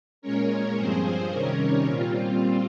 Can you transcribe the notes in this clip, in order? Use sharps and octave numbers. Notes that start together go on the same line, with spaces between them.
A#2 G#3 C#4 A#4 C#5
G2 F3 C4 G#4 C5
C3 D#3 G3 C#4 A#4 C#5
A#2 G3 C4 F4